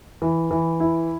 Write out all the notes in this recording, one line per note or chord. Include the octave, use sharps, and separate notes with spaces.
E3
E3
E4